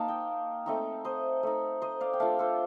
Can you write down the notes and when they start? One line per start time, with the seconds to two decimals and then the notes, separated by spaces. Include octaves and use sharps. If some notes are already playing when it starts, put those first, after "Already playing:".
Already playing: A#3 D#4 F5 A5
0.08 D#5 G5
0.66 A3 C4 D#4
1.05 C5 D#5
1.43 A3 D#4
1.82 C5 D#5
2.01 D5 F5
2.13 G5
2.20 A3 D4 F4 F5 A5
2.39 A4 C5